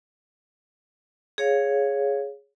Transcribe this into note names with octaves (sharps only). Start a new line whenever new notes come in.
G#4 C#5 F5